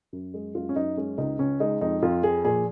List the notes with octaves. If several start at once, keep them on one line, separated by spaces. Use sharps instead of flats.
F#2
G#3
F#2 F4
C#4
F#2 D#4
G#3 C#4
C#2 D#4
C#2 C#4
G#3 D#4
F2 D#4
F2 F4
F3 G#4
A#2 G#4